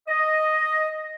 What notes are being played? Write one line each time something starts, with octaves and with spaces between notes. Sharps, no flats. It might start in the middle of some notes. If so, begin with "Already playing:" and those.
D#5